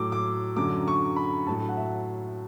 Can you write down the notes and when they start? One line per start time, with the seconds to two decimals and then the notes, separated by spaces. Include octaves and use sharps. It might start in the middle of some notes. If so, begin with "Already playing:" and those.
Already playing: A2 F#3 D6 E6
0.12 D6
0.56 F#2 D3 F#3 D6
0.88 C#6
1.16 B5
1.47 A2 F#3 A5
1.69 F#5
1.77 E5